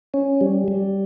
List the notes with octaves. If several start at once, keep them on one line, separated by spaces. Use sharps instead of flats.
C#4
G3
G3